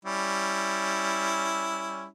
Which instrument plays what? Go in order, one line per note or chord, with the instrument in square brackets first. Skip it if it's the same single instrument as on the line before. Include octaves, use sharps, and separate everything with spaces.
[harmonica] G3 C#4 E4